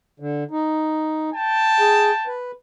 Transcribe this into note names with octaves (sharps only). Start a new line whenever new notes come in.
D3
D#4
G5 A5
G#4
B4